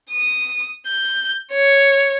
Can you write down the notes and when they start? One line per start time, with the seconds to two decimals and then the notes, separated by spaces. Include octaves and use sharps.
0.11 D#6
0.87 G6
1.53 C#5